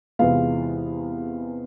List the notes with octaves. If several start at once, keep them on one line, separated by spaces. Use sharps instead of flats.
E2 C3 E3 G#3 B3 F4 F5